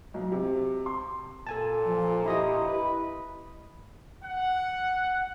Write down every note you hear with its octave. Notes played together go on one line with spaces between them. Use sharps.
B1
C3
C6
A#2 A4 G#5 A5
F3
E4 G4 D#5 D#6
B4
F#5